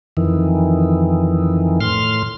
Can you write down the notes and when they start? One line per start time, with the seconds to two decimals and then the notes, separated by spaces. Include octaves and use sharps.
0.17 F2 D#3 E3
1.81 A2 C6 F6